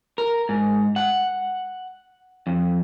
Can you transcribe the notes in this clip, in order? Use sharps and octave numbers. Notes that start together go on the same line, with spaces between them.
A#4
G#2
F#5
F2